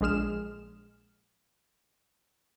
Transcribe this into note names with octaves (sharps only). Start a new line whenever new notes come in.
A#1 G#3 G#4 F6 E7